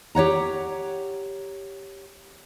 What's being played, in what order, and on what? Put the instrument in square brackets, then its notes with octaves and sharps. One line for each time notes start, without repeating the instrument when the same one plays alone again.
[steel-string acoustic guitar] G4 C#5 F#5 A#5